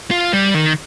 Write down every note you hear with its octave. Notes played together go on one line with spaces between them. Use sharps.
F4
G3
D#3